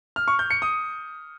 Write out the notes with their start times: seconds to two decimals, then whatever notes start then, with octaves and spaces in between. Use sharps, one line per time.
0.16 F6
0.28 C#6
0.39 G6
0.50 C#7
0.62 D#6